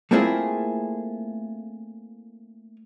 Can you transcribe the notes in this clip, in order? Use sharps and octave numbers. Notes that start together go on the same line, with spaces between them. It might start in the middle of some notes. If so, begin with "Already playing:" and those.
A3 A#3 C4 E4 F4 G#4